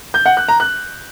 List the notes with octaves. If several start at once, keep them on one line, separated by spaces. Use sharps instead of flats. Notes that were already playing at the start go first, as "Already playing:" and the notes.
G6
F#5
F#6
A#5
F#6